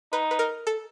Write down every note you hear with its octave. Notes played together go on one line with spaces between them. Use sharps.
D#4 B4
B4
A#4
A4